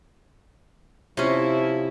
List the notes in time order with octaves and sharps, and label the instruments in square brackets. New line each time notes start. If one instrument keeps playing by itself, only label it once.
[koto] C3 C#4 [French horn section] F3 E4